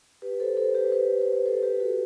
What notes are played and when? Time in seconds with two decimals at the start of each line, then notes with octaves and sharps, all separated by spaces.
0.22 G4 B4
0.40 A4 C5
0.57 A4 C5
0.75 G4 B4
0.85 C5
0.92 G4 B4
1.22 C5
1.34 B4
1.46 A4 C5
1.63 G4 B4
1.80 F#4 A4